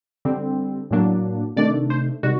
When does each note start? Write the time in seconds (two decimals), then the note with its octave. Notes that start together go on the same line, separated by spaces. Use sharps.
0.25 D3 G3 C4
0.91 A2 F#3 A#3 D4
1.56 C3 D#3 A3 D4 D5
1.90 C5
2.23 C3 D#3 G3 F#4